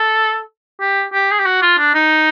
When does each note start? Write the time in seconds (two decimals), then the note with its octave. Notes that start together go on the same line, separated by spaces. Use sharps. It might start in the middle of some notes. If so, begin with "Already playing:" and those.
Already playing: A4
0.81 G4
1.13 G4
1.32 G#4
1.39 G4
1.46 F#4
1.62 F4
1.78 D4
1.95 D#4